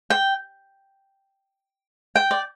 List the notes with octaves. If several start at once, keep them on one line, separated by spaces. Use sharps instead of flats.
G5
G5
D5